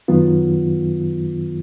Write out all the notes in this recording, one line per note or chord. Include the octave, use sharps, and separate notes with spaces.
F#2 D#3 F#3 B3 F4